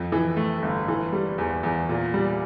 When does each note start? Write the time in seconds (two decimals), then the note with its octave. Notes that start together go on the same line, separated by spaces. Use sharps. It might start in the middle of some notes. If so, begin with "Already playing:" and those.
Already playing: F2
0.12 E3
0.37 A3
0.62 G1
0.88 E3
1.12 G3
1.38 E2
1.63 E2
1.89 A#2
2.14 G3